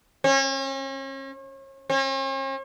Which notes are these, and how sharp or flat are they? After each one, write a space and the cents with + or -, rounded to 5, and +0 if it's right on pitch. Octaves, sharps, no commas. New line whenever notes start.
C#4 -40
C#4 -45